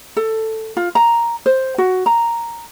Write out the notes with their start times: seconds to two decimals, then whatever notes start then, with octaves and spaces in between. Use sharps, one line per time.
0.17 A4
0.77 F4
0.95 A#5
1.46 C5
1.78 F#4
2.06 A#5